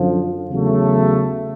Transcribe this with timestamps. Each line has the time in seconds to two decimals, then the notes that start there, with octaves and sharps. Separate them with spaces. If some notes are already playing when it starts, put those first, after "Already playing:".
Already playing: F#2 D3 F3
0.50 E2 C#3 F#3 A3